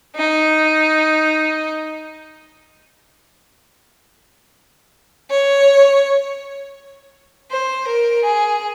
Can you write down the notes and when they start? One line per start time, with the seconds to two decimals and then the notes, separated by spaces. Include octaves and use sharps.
0.16 D#4
5.30 C#5
7.51 C5
7.87 A#4
8.24 G#4